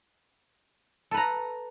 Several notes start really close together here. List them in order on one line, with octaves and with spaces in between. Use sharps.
A4 B4 A#5